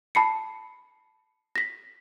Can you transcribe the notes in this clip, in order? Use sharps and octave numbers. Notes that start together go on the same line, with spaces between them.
A5 B5 C7 C#7
A#6 B6